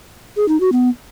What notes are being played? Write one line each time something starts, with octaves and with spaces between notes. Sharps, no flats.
G#4
D#4
F#4
B3